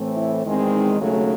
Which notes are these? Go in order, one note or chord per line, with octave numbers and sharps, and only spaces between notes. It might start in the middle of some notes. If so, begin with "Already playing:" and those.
Already playing: A2 E3 A3 C4
E4
E2 D#3 G#3 C4
D#4
D#2 C#3 F#3 A3